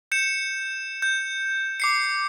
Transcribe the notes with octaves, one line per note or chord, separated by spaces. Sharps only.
G6 C#7 E7
G6
D6 C7 C#7